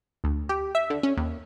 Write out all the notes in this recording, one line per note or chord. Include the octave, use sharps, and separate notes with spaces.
D2
G4
E5
D3
C#4
D#2